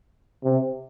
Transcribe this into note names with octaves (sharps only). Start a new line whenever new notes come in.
C3